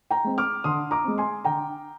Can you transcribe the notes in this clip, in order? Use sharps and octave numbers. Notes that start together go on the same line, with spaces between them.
G5 A#5
G#3 C4
D6 F6
D3 C6 D#6
A#5 D6
G#3 C4
G#5 C6
D3 G5 A#5